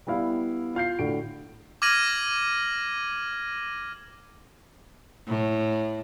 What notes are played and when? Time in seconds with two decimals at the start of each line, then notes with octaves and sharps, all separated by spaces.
0.07 G3 B3 E4 F5
0.75 F4 F5 G6 C7
0.99 A2 D3 F#4 D7
1.82 D6 F6 G#6 A#6 D#7 F#7
5.27 A2